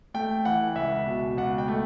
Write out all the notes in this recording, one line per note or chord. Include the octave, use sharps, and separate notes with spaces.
A3 G5
E3 F#5
C#2 E5
B2
C#2 F#5
G5
A3